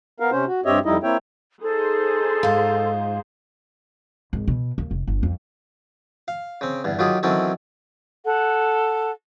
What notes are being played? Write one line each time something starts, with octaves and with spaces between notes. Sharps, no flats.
B3 A#4 F5
C3 C#4 C5
F#4
G2 C4 G4 C#5 D#5 E5
F2 G3 D#4 E4 D#5
A#3 C4 E4 C#5 E5 G5
D#4 G#4 A4 C5
G#2 F4
G#1
B2
D#2
F1
G1
F2
F5
C#3 C4
E2 G2
D#3 F#3 F4 G4 G#4
D#3 E3 F#3 C4 C#4 A4
A4 F#5